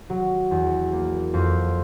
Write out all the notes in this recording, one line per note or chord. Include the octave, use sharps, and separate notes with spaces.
F#3
E2
A#3
F2